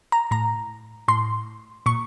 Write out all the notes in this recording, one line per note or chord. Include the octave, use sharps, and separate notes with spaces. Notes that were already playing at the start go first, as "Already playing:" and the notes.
A#5
A2 A#5
A2 C6
A#2 C#6